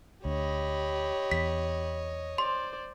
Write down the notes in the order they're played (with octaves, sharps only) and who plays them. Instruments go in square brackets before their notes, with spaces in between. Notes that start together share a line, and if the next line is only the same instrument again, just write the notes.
[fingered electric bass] D2 [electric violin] G4 B5 [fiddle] C#5 D#5
[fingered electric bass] E2 [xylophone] B6
[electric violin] C5 D5 [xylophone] C6